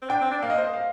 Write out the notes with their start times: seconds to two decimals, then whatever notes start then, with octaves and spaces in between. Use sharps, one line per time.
0.02 C4
0.10 D4 G5
0.21 C4
0.31 D4
0.42 A#3 F5
0.50 D#5
0.58 C5
0.74 F5